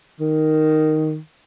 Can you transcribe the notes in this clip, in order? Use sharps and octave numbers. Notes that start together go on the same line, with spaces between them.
D#3